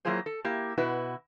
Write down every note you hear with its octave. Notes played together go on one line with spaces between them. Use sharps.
F#3 A#3 E4 F4 G#4 C5
A4
A#3 E4 G4
B2 E4 F#4 B4